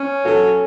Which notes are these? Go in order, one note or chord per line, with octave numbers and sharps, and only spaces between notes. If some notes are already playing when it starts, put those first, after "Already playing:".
Already playing: C#4
F#3 F#4 A4